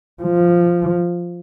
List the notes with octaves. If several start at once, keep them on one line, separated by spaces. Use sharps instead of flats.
F3